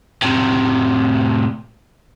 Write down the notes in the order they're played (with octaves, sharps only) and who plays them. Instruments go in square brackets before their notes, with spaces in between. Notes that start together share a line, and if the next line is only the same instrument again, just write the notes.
[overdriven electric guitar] A2 C3